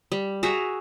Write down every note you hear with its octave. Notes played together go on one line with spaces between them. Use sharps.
G3
F#4 G#4 E5 A#5